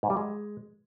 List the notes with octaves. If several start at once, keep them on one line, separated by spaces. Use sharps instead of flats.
G#2
G3
G#3